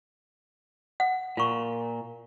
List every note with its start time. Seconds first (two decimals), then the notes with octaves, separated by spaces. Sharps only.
1.00 F#5
1.37 A#2 F4 C#6